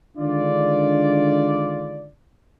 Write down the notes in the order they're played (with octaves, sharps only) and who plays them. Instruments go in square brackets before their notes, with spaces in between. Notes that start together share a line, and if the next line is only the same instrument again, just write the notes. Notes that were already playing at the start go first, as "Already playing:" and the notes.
[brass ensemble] D3 D#3 G#3 D4 F4 D5